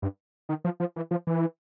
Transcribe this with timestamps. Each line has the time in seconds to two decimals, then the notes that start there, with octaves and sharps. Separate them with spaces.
0.02 G2
0.49 D#3
0.64 F3
0.80 F3
0.96 E3
1.11 F3
1.27 E3